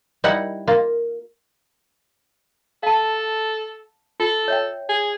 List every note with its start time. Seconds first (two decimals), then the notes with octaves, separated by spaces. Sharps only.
0.24 G3 D#4 E4 F#5
0.67 A#3 F4
2.83 A4 F5 A5
4.20 F4 A4
4.48 C#5 E5 G5
4.89 G#4